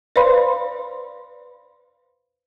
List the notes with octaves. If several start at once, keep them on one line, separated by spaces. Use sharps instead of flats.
B4 C5 D5 F5 B5 C6